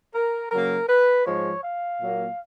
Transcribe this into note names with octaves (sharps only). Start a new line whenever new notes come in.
A#4
C#3 F#3 A#3 A#4
B4
G#2 F3 G#3 C#5
F5
A#2 F#3 A#3